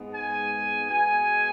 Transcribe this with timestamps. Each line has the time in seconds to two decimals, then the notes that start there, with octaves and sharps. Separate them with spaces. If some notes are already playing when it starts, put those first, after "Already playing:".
Already playing: G#2 G#3 B3
0.12 G#5
0.89 B2 G#3 B3 G#5